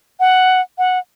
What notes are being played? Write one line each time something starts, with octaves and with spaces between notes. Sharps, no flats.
F#5
F#5